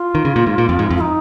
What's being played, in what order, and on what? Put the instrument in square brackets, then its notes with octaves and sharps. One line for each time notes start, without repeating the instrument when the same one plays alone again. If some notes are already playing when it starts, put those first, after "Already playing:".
Already playing: [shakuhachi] F4
[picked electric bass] D#3
C#3
A#2
G#2
A#2
F2
G#2
F2
[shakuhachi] F4
D#4